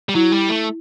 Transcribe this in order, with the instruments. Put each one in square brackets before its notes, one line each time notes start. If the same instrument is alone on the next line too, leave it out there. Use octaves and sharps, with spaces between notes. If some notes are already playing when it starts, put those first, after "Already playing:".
[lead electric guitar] G3
[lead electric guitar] F#3 [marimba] E4
[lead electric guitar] G3
A3